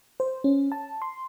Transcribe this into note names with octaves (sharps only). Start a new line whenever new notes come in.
C5
C#4
A5
C6